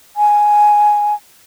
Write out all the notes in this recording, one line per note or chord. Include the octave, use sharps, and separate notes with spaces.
G#5